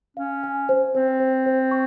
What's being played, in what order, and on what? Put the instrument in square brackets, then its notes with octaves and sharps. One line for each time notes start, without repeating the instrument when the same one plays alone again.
[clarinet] C#4 [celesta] F5
[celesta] G#5
C5
[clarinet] C4 [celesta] C5
[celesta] C5
C5
C#6